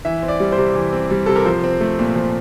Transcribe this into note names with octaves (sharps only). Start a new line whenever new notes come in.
E3 E5
C4
D5
G3
C5
C3
E3
C4
G3
C3 A4
A#4
F3 C5
C4
A3
A#2
F3